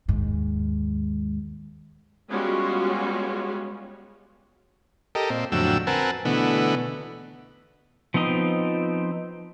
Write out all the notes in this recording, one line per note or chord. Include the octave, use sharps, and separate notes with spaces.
D#2 G#2
G3 G#3 B3 C#4 F4 F#4
G4 A4 A#4 D#5
A#2 C4
F2 A2 D3 F#3 G5 E6
C4 A#4 B4 F#5 G#5 A5
B2 D3 E3 A3 B3
F3 B3 C4 D#4 D#6